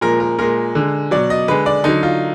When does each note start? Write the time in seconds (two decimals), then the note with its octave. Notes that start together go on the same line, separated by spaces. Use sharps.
0.01 A#2 F3 G#3 A#4
0.20 A#4
0.39 A#2 G#3 A#4
0.75 D3 G#3
1.11 B2 F#3 D5
1.30 D#5
1.48 D3 G#3 B4
1.66 D5
1.84 D3 F#3 D#4
2.03 F4